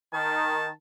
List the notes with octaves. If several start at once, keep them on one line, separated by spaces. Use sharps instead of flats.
D#3 A5